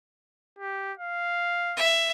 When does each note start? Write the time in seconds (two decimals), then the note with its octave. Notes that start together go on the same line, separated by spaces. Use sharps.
0.58 G4
0.99 F5
1.77 E5